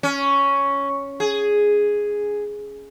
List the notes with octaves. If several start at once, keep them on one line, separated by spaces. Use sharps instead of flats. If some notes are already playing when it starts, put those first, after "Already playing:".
C#4
G#4